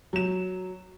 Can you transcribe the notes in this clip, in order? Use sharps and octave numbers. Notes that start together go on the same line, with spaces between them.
F#3 E7